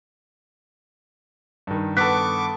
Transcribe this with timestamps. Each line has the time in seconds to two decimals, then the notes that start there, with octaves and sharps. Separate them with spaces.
1.67 G2 D#3
1.97 B3 A4 C#6 D6 F#6 B6